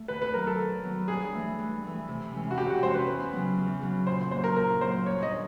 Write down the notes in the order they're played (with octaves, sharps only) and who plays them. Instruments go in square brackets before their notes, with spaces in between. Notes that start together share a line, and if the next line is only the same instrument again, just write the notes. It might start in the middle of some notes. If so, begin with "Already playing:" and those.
Already playing: [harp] A3
[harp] D#3 [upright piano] B4
[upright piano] B4
[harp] F#3 B3 [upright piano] A#4
[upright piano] A4
[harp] D#3
F#3 B3
[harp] G2 [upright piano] G#4
[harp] E3 A3
G2
E3 A3
C3
E3 G#3 C#4
[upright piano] F#4
[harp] C3 [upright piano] G4
[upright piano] F#4
[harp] E3 G#3 C#4 [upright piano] C5
[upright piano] B4
[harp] E2
C#3 F#3 B3
E2
C#3 F#3 B3
[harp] A#2 [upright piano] C5
[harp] F#3 A#3 [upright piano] C5
[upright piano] A#4
[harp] A#2 [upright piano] A#4
[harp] F#3 A#3 [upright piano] C5
[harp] G2 [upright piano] C#5
[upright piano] D#5
[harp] D#3